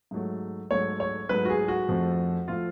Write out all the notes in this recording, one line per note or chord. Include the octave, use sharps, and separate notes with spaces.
G#2 F#3 A3
G#2 F#3 A3 C#5
C#5
G#2 F#3 A3 B4
F#4
G#4
F#4
F2 F3 A3
F3 A3 F4